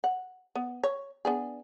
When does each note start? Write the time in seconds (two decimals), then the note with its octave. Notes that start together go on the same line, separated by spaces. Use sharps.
0.04 F#5
0.55 B3
0.83 C#5
1.25 B3 D4 G#4